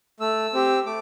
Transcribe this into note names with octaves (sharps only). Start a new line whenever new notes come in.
A3 E6
C4 G4
A3 D6